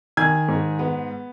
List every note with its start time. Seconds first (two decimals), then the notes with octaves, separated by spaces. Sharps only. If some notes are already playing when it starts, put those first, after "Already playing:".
0.17 D#3 G#5 G#6
0.48 G#2
0.79 B3